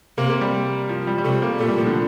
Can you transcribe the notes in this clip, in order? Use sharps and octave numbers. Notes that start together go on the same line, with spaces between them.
C3 A#3
A#3
G3
F3
G3
G3
C3 A3
A#3
A#2 A3
G3
F3
D3